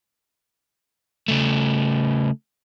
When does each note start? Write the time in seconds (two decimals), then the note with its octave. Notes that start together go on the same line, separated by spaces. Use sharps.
1.28 C#3 A3